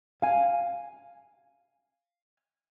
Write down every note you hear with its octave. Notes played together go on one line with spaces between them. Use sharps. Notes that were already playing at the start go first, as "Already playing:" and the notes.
F5 G#5